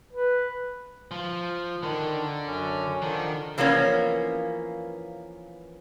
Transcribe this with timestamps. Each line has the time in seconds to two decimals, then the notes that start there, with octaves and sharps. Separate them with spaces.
0.13 B4
1.11 F3
1.83 D3 D#3
2.47 F#2 C#4
3.02 D3 D#3 F3 D4
3.58 E3 F3 A#3 B3 C#4